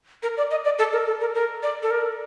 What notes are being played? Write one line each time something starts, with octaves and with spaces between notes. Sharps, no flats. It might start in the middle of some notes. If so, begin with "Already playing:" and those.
A#4
D5
D#5
D5
A4
A#4
A4
A#4
A#4
D5
A4
A#4